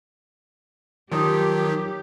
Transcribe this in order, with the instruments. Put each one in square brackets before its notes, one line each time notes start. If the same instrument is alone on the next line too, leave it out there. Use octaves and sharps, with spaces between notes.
[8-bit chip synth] D#3 F#3 [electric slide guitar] F3 D#4 [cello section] G4